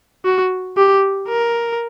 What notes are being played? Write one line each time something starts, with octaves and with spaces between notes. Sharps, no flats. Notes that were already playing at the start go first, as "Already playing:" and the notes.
F#4
G4
A#4